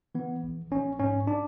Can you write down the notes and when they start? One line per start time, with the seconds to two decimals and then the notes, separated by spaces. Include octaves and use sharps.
0.15 E3 B3
0.44 A#1
0.71 A#1 C#4
0.99 G#2 C#4
1.27 D4